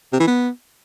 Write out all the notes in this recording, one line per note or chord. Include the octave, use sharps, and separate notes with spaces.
C3
E3
B3